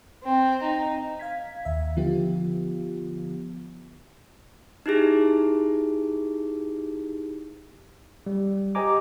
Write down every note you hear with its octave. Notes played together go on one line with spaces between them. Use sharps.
C4
D#4
F5 G#6 B6
D#2 E5
D3 F3 B3 F4 G4
D#4 E4 G4 G#4
G3
G4 C5 D#5 G#5 A#5 D6